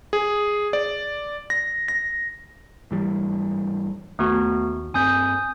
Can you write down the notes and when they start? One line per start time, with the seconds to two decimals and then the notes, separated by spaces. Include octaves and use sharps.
0.13 G#4
0.73 D5
1.50 A#6
1.88 A#6
2.91 G#2 E3 G3
4.19 D#2 A3 B3 F#4
4.94 G2 C4 G#5 D#6 G6